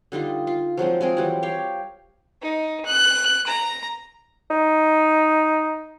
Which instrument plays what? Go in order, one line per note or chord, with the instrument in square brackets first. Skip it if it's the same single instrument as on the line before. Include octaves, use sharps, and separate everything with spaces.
[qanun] D3 G3 D#4 F4
F4
F3 F#3 G#3 C4
G#3 C4 G#4 A#4
E3 F#3 G3
G4 C#5 F5 G5
[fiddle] D#4
F#6
A#5
[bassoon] D#4